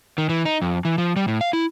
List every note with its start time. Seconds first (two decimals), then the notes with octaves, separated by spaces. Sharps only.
0.18 D#3
0.29 E3
0.46 D#4
0.62 F2
0.85 E3
0.98 F3
1.16 G3
1.28 A2
1.41 F5
1.53 E4